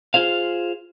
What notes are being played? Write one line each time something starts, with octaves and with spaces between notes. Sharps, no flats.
F4 G#4 C5 F5